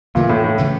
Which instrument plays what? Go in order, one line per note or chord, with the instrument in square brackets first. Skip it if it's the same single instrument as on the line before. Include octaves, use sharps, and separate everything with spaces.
[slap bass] F2 C#3 E3 A3 [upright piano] A#2
[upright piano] A2
A2
[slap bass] C#3 E3 A3